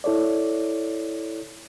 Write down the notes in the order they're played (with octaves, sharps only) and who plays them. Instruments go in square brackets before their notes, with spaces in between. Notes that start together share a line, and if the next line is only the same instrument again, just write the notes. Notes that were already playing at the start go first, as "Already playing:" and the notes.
[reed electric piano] E4 A4 C#5 D5